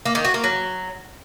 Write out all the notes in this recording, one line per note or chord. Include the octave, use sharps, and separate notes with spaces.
A#3
D#3
F#4
A#3
F#3